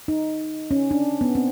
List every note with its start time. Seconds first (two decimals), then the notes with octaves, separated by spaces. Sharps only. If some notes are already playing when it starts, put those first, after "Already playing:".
0.08 D#4
0.71 C#4
0.91 D4
1.21 B3
1.35 C4